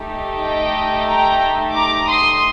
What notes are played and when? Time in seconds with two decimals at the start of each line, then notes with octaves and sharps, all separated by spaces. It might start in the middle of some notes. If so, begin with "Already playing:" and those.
Already playing: A3 D#4 G4
0.40 D#5 G5
1.08 G5 A#5
1.74 A#5 D6
2.08 C6 D#6